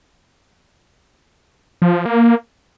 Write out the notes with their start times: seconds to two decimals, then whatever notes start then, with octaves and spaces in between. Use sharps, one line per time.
1.82 F3
1.94 F3
2.05 A#3